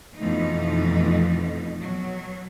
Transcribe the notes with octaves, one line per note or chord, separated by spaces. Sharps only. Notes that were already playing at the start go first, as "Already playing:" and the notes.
F2 B2 E3 A3 D#4
B2 F#3